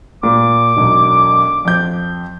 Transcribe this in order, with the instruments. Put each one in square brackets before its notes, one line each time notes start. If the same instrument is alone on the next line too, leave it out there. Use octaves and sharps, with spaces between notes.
[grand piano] A#2 [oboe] D6
[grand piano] E1 B1
F2 G6